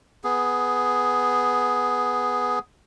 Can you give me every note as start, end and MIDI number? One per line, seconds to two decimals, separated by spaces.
0.24 2.59 59
0.24 2.59 68